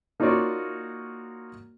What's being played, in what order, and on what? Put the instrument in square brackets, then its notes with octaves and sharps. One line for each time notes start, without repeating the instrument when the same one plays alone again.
[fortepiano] A#3 D#4 F4 F#4 C#5 D5